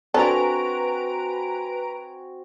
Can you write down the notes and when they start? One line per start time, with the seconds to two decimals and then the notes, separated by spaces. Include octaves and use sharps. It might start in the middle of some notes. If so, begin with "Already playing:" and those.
0.14 C4 D4 F#4 A4 B4 G#5 A#5 D7